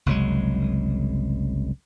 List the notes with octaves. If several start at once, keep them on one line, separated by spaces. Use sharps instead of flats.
F#1 C2 F#3 G#3